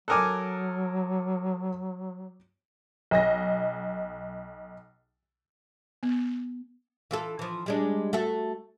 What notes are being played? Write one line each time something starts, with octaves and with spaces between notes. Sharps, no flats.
F#3 A4 A#4 G#5 D6 D#6 F#6
B1 D#5 A#6
B3
E3 F4 A4
E3 F3
G3 G#3 D4
A3 F#4 A4